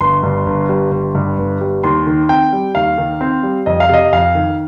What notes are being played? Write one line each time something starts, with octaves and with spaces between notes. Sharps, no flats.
G1 C6
G2
G1
G3
G1
G2
G1
G3
D#2 C6
D#3
C4 G5
G3
D#2 F5
D#3
C4
G3
F2 D#5
F5
C3 D#5
F2 F5
D#3